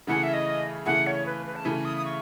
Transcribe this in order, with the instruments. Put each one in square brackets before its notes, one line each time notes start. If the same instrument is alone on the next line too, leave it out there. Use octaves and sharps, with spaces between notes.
[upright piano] C#3 E3 A3 E4 G#4 [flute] F#5
[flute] E5
D#5
[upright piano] C#3 E3 A3 E4 G#4 [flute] F#5
[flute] C#5
B4
B4
A5
[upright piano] C#3 E3 A3 E4 [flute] G#5
[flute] D#6
D#6
C#6